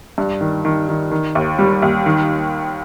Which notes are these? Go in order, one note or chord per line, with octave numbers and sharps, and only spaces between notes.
G2
D#3
D#3
D#3
D#3
D#2
G3
D#2
D#3